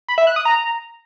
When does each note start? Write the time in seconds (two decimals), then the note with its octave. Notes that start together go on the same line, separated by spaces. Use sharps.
0.08 B5
0.18 E5
0.27 F#6
0.36 D#6
0.45 A#5